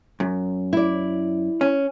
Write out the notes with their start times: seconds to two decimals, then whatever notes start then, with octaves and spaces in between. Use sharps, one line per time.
0.20 F#2
0.73 E4 D5
1.61 C#4